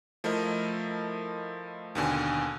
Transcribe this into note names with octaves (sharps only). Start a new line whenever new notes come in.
F3 A3 E4 A#4 D#5
D#2 B2 D3 G#5